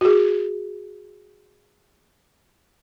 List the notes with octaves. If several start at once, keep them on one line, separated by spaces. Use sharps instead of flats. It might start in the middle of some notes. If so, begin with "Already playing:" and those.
F#4 G#4